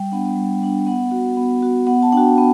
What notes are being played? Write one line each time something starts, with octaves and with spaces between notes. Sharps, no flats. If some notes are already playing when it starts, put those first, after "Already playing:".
Already playing: G3 G5
B3 D4 F#5
G3
B3 D4
B3 F#5
F#4
B3
F#4
B3 F#5
A5
D4 F#4 G5
B3 G5